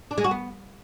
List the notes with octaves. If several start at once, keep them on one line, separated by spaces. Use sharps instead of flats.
D4
G#3
F#4
B3